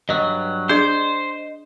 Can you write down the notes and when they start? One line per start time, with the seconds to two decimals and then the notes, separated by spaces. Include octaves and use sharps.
0.09 G2 F#3 D#5
0.69 D4 G#4 C5 D5